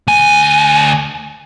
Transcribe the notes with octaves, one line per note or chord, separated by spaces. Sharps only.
D2 G#5